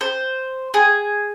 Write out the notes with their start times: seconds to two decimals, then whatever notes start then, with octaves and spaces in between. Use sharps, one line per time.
0.01 C5
0.74 G#4